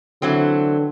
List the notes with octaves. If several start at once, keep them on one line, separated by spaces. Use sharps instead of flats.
D3 E3 F#3 C4